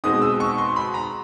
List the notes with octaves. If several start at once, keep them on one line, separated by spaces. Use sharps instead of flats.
B2 G#3 C4 D#4 D#6
E6
C#6
C6
B5
A#5